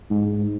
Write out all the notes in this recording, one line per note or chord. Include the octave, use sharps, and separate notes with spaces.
G#2